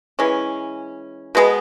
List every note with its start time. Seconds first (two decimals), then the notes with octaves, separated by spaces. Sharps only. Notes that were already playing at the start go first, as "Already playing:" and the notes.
0.19 E3 G#3 C#4
1.35 B2 G#3 B3